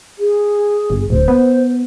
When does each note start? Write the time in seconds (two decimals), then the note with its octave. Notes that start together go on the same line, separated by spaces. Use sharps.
0.19 G#4
0.90 G1
1.10 D1 C5
1.28 B3